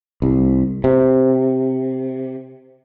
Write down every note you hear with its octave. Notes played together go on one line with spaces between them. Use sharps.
C2
C3